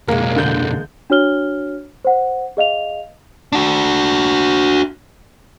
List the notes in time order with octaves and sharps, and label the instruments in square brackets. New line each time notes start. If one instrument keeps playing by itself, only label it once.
[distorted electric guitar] B1 F2 [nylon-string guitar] G#3 A#3 [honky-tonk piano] A#4
[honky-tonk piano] D3 G6 F#7
[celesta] D4 F#4 C#5 F6 G7
C5 F#5
G#4 D#5 F5 F7
[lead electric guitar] D4 F#4